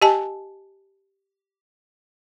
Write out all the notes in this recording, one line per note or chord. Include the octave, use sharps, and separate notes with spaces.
G4 D#5 G#5 A5